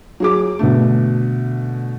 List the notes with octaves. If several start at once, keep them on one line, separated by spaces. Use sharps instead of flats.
F#3 G#4 D6
B2 D3 A3